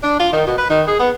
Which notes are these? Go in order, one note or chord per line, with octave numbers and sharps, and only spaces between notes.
D4
F4
D#3
B2
B4
D#3
G#4
B3